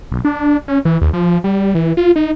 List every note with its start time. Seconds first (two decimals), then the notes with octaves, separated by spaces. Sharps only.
0.12 B1
0.25 D4
0.68 C#4
0.85 E3
1.01 D#2
1.13 F3
1.44 G3
1.75 E3
1.97 F4
2.16 D#4